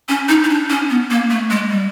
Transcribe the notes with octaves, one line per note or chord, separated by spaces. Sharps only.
C#4
D#4
D#4
D4
C#4
B3
A#3
A3
G#3
G3